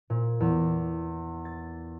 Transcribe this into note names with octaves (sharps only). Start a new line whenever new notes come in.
A#2
E2
A6